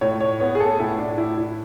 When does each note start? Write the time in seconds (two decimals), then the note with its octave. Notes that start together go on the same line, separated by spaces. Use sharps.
0.01 A2 C#5
0.21 C#5
0.40 B3 C#5
0.55 G#4
0.60 A4
0.79 A2 E4
0.98 D4
1.18 A2 E4
1.37 E4